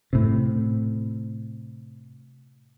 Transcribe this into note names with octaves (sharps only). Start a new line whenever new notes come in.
A2 C3